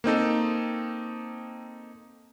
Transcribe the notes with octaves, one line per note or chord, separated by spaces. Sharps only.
A#3 C4 D#4 A4